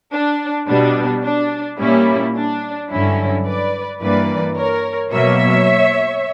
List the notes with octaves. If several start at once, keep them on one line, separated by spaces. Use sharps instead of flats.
D4
B2 G3 B3 D4
D4
A#2 G3 A#3 C#4 E4
D4
G2 D3 F#3 C#4 E4
B4 D5
G2 E3 A#3 B4 D5
A#4 C#5
B2 F#3 A#3 C#5 E5